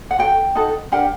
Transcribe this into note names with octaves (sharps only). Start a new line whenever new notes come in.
F#5
F#4 A4 G5
D#4 F#4 A4
D4 G4 A#4 F#5